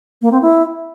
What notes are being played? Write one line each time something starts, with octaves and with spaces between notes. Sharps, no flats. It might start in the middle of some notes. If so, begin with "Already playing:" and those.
A#3
C4
E4